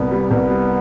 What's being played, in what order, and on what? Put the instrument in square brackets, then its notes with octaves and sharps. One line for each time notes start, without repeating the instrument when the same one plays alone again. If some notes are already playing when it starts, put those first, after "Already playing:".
Already playing: [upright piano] C2 [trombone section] B3
[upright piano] G3
[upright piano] C2 [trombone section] B3
[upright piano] G3